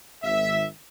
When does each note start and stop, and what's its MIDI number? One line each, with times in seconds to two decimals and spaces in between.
0.23 0.65 32
0.23 0.65 76